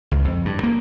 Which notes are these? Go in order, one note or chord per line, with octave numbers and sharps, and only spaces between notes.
C#2
F2
G2
A#3